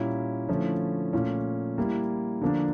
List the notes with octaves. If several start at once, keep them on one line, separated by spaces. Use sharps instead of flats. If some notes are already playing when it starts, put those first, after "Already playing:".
Already playing: A#2 G3 A#3 C#4 E4
D3 F3 A3 C#4 E4
A#2 A3 C#4
G3 A#3 E4
D3 F3 A#3 D4